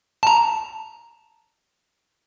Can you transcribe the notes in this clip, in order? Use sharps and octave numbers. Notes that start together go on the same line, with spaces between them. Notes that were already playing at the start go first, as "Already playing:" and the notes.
A5 A#5